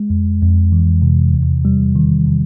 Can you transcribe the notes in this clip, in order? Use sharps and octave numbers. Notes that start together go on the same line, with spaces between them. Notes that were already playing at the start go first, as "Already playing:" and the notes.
Already playing: G#3
F2
F2
E3
C3
E2
G3
D#3
C3